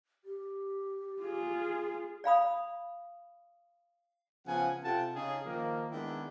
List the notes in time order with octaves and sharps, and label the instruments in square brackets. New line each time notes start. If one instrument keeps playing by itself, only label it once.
[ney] G4
[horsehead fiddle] F4 G#4
[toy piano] D5 F5 B5 D#6
[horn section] C#3 F3 B3 F#5 G#5
C3 F4 A4 F#5 G5 A5
C#3 C#4 D#4 G#4
D#3 F3 A#3
D#3 G#3 B3 D4 E4